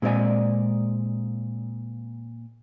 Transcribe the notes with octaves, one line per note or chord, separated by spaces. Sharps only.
A#2 G#3 C4 G4 D5 G#5